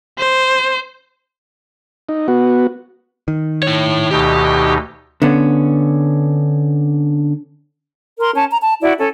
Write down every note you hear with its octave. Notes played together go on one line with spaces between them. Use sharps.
C5
D#4
B3 F#4
D#3
E4 C#5
D2 B2 D#4 G4
D3 B3 C#4
A#4 C6
C#4 A5
A#5
A5
E4 F#4 D5
C#4 A4